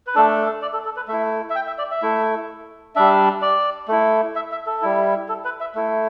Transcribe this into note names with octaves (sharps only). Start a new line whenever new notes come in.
B4
A3 D4 A4
A4
D5
A4
A4
B4
A3 E4 E5
E5
G5
E5
D5
E5
A3 E4
G3 D4 E5
D5
A3 E4
E5
E5
A4
G3 E4
A4
B4
E5
A3 E4